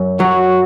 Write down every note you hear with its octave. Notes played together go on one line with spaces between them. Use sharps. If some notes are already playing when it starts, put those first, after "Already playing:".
Already playing: F#2
F#3 F#4